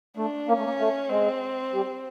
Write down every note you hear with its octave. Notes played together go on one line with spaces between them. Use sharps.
A3 D4
A#3 C#4
A3
A#3
A3
G#3 C4
G3